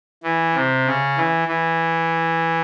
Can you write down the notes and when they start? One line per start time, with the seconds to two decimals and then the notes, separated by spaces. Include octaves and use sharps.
0.23 E3
0.54 C3
0.86 C#3
1.17 E3
1.48 E3